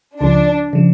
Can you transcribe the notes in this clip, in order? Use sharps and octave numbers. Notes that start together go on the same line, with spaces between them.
C#2 C#3 F3 D4
C#3 F3